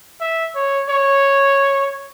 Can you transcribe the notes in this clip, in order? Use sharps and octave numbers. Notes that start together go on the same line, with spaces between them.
E5
C#5
C#5